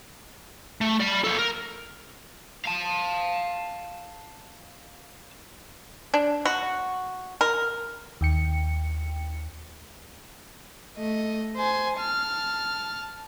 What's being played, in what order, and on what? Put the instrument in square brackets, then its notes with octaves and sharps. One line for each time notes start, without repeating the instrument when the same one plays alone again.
[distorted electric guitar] A3
D5 B5
A#3 A4
A#4
[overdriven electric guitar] F5 A5
[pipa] D4
F#4
A#4
[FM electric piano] D#2 G5 C#7
[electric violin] A3 D#5
C5 G#5
A5 F6